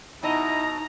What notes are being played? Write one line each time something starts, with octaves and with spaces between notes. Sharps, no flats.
B2 D#4 E4 D#5 A#5